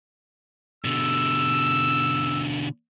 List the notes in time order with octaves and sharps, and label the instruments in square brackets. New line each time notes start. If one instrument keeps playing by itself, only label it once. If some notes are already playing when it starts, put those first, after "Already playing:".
[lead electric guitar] B2 D3 [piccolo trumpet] E6